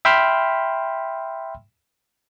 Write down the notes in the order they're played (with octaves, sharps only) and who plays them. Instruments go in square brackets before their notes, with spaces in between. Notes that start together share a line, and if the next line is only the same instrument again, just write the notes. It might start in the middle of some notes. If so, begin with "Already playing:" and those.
[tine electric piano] E5 G5 B5 C6 E6 F6